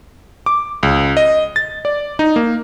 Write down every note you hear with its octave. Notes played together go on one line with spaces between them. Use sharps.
D6
C#2
D#5
A6
D5
D#4
A#3